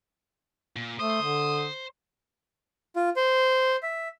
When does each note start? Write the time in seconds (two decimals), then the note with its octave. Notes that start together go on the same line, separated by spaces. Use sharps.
0.76 A#2
0.99 A3 C5 D#6
1.22 D3
2.96 F4
3.16 C5
3.83 E5